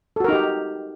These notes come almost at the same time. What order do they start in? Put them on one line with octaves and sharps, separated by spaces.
A4 F#4 A#4 D#4 G4